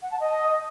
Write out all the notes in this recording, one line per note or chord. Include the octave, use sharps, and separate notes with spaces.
F#5
A5
D#5